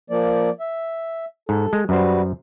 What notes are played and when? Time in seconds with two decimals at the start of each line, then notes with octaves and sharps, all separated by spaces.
0.10 F3 A#3 D5
0.60 E5
1.49 G#2 A4
1.73 G#3
1.89 F#2 G3 F#4 B4 C5